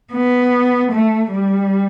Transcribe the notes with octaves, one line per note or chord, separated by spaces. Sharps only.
B3
A3
G3